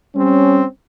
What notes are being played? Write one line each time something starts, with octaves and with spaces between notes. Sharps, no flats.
G3 C4 C#4